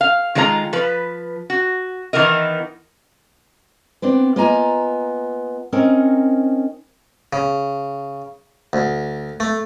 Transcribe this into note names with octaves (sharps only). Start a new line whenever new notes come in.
F5
D#3 G#3 F4 C5 A#5
F3 B4
F#4
D#3 E3 B3 A#4 D#5
B3 C4 D4
A#3 B3 F4 D#5 G#5 A#5
C4 C#4 D#4 A#4
C#3
D2
A3